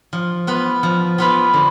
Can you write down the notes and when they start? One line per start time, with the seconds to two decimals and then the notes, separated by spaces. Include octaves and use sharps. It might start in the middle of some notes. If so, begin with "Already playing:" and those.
0.13 F3
0.47 B3 F4 B4
0.83 F3
1.18 B3 F4 B4
1.54 D3